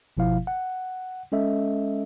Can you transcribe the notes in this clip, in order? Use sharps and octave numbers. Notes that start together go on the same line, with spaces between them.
G1 B2 F3 E4 F5
F#5
G#3 C#4 A4 D#5 E5